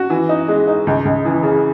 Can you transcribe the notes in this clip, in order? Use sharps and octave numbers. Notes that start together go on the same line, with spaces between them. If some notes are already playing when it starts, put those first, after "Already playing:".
Already playing: F#4
E3
D#4
G#3
D#4
C#2
C#2
E3
C#3